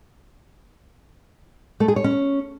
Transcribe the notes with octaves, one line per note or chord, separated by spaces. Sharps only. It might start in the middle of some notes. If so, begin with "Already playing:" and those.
A3
G#4
C#5
C#4